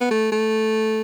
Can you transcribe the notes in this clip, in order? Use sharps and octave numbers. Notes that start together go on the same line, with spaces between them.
B3
A3
A3